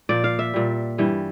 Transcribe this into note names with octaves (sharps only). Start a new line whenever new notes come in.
A#2 F3 D5
F5
E5
A#2 G3
G2 E3 G3